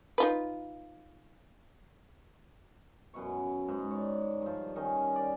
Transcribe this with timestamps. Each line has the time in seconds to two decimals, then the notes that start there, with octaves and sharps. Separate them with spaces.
0.18 D#4 F4 B4
3.14 F#2 B2 E4 C#6
3.68 G#2
3.91 C#5 D5
4.42 G2 F3
4.76 D#3 C#4 D#5
5.16 D5